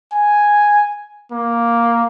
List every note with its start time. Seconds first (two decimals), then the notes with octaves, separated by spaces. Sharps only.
0.12 G#5
1.31 A#3